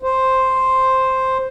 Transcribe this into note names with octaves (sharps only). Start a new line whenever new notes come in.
C5